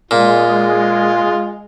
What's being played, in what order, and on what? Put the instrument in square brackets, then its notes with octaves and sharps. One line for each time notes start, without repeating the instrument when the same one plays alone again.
[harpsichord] A#2 [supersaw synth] G#3 [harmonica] F4